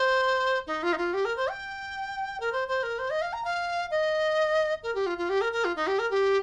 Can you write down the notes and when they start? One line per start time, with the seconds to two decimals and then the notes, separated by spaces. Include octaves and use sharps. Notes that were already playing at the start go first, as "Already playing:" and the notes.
Already playing: C5
0.67 D#4
0.83 F4
0.93 D#4
0.98 F4
1.14 G4
1.25 A#4
1.37 C5
1.48 G5
2.40 A#4
2.53 C5
2.68 C5
2.83 A#4
2.99 C5
3.10 D#5
3.22 F5
3.33 A#5
3.45 F5
3.91 D#5
4.83 A#4
4.95 G4
5.06 F4
5.18 F4
5.29 G4
5.41 A#4
5.53 A#4
5.65 F4
5.76 D#4
5.87 G4
5.99 A#4
6.11 G4